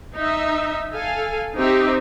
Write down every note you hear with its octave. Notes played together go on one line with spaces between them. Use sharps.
D#4 E5
A4 F5 G#5
C4 D#4 G4 E5